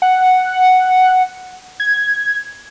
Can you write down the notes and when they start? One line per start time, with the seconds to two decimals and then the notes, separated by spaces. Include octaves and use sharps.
0.02 F#5
1.80 G#6